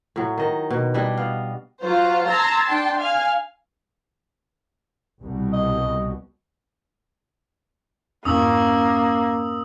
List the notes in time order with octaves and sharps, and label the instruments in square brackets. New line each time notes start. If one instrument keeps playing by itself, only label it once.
[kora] A2 F#3
D#3 D#5
B2
G3 D4 E4 D#5
B3 F5
[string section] F#3 F4 C5 F5
A5 A#5 C6 E6 G#6 A6
D4 G5 A5 C6
F5 G#5 F6
[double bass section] C2 B2 G3
[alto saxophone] D#5
[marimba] F2 G#2 [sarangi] A#3 [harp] C#4 [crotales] D#6 E6 F#7